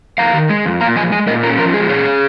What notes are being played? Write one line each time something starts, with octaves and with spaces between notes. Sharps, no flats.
F2 F5 A#5
D#3
G#3
F2
A#2 F5 A#5
F3 D#5 G#5
G#3 D#5 G#5
A#2 A#4 D#5
C#4 F4 A#4
F3 F4 A#4
G#3 G#4
A#2 G#4 C#5